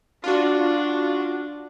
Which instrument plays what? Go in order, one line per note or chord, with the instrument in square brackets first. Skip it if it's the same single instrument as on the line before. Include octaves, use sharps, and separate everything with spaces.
[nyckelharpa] D4 [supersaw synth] F4 F#4